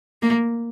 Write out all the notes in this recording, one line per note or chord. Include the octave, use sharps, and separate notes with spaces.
A#3